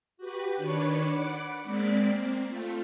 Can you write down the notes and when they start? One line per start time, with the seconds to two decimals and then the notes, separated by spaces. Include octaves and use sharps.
0.17 F#4 G4 B4
0.57 D#3 D4 B4 C#5 D5 B5
1.07 F#5 B5 D6
1.64 G#3 A#3 C4 D5 B6
2.12 A#3 C4
2.46 A3 F4